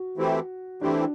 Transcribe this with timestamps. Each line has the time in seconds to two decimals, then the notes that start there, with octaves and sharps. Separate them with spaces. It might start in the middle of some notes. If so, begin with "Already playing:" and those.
Already playing: F#4
0.17 E3 A3 C4 E4 G4
0.81 E3 A3 C4 D4 E4 G4